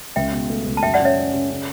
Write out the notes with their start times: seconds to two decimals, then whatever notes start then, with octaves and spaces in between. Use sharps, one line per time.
0.16 C#2 E5 G5
0.32 B2
0.50 A3
0.66 C#2
0.77 A5
0.83 F#2 E5 G5
0.94 D5 F#5
0.99 C#3
1.05 C#5 E5
1.17 C#4
1.34 C#3
1.50 C#3